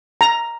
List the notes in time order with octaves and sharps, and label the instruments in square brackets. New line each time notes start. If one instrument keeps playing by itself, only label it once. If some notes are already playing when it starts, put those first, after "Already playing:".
[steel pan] A#5